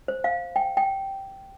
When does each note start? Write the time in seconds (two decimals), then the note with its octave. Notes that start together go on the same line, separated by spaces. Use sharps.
0.08 C5
0.24 F5
0.56 G5
0.77 G5